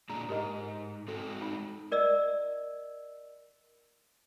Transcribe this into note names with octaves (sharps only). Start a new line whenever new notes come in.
A#2 G#3 D4 A#5
G#2 G4 A#4 D#5
G#3 C4 F#4 A4
D#4
A#4 D5 D#5 E6